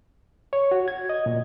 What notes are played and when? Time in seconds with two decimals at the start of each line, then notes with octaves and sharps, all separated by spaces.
0.53 C#5
0.72 F#4
0.88 G#6
1.09 D#5
1.26 A#2